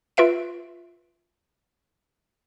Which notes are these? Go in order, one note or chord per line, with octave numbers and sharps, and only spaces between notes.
F4 B4 E5 D7